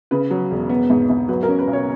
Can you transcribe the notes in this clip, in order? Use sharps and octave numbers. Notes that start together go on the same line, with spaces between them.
C#3 B4
F#3
E1
B3
G#2
G#2
F#3 B4
A#4
C#4
B4
B1
C#5